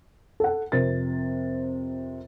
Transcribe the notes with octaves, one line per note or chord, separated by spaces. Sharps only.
A4 F#5
F2 C3 A#4 A6